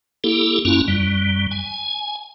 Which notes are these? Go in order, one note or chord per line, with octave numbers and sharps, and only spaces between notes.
A#3 E4 G4 A4
F#2 A#3 C#4 E4 F4
F#2 G3
G#5